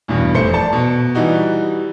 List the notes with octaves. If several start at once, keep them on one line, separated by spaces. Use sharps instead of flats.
E2 G2 B2
F1 A3 C5 C#7
D5 A5
B2
E3 G3 D#4 F#4